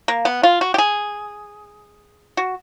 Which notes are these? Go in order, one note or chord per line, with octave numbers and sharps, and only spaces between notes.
A#3
B3
F4
F#4
G4
G#4
F#4